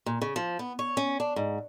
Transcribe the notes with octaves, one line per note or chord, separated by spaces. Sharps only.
A#2
C#3
F3
B3
C#5
C#4
D4
G#2